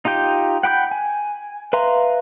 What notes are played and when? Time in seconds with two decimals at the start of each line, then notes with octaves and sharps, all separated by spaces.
0.05 D#4 F4 G4 G5
0.63 F#5 G5 B5 D6 G6
0.91 G#5
1.73 B4 E5 F5 A#5 C6